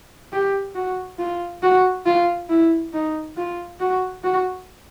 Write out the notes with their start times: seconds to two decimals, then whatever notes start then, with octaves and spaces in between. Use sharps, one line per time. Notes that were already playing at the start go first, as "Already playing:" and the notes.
0.32 G4
0.75 F#4
1.18 F4
1.63 F#4
2.06 F4
2.49 E4
2.93 D#4
3.37 F4
3.80 F#4
4.24 F#4